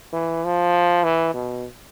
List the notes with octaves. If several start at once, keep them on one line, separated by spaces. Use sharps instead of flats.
E3
F3
E3
B2